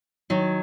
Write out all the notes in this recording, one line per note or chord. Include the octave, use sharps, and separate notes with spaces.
D#3 F#3